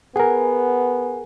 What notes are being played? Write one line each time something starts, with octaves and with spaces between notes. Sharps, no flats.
B3 G#4 A#4 F#5 G#5